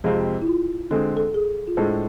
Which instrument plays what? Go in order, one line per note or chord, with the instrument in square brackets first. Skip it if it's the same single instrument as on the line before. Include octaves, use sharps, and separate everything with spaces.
[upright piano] F2 C3 G#3 C4 F4 [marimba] G#4
[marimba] E4
F4
[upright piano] D3 G#3 C4 G#4 [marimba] A4
[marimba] A4
G#4
F4
[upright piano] A2 G#3 D4 A4 C5 [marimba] G#4